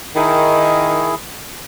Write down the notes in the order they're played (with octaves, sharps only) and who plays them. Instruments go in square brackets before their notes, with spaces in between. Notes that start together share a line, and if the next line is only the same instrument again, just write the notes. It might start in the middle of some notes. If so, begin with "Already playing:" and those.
[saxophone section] D#3 [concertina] E4 G#4